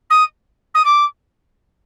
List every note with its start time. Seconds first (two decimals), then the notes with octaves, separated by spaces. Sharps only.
0.10 D#6
0.74 D#6
0.84 D6